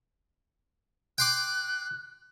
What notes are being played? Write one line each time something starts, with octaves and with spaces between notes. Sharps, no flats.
G5 C6 D6 F#6